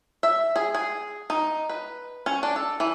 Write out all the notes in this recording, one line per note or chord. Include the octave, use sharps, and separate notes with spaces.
E5
G#4
G#4
D#4
B4
C#4
D4
A4
E3